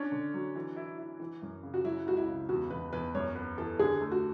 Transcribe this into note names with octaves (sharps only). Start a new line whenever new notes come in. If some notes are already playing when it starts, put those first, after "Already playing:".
Already playing: C#4 D4
D3
F#3
E3
E4
E4
E3
F#2
C#3
F#4
F#3 E4
C#2 F#4
E4
C#3
E2 F#4
E2 B4
E2 B4
F#2 C#5
B3 B4
E3 A4
D3 G#4
A3
F#4